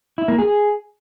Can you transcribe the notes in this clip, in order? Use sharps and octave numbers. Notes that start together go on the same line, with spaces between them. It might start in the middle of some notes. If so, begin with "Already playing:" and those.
E4
A#3
G#4